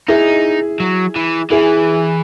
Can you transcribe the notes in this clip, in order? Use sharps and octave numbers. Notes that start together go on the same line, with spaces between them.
D#4 E4 G#4
F#3
E3
E3 E4 G#4